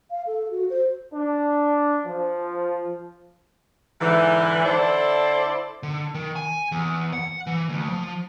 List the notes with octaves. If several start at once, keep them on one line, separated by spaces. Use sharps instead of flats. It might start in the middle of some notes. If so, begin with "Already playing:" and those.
F5
A4
F#4
C5
D4
F3
G#2 D3 E3
D3 E4 A4 C5 D5
D3
D#3
G#5
E2
F#5
E3
D2
F3